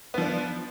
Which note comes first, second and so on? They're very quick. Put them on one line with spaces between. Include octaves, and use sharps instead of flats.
B3 F3 D4